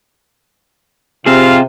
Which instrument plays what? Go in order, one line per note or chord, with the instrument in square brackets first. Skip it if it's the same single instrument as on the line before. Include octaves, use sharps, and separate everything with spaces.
[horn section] C3 [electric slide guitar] C4 G#4 [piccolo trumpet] F4 [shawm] F5